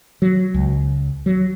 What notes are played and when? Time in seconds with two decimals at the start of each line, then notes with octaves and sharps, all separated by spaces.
0.22 F#3
0.54 C#2
1.26 F#3